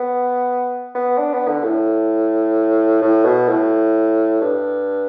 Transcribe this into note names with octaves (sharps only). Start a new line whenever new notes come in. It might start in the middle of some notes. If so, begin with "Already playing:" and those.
Already playing: B3
B3
D4
B3
D3
A2
A2
B2
A2
G2